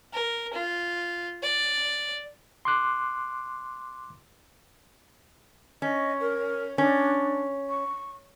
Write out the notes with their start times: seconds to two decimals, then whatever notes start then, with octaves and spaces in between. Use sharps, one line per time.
0.13 A#4
0.53 F4
1.43 D5
2.65 C6 D6 F#6
5.82 C#4 D#5
6.20 A#4
6.78 C#4 D4
7.70 C#6